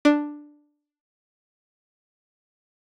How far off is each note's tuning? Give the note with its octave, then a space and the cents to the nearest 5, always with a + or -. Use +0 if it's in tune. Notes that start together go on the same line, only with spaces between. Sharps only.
D4 +5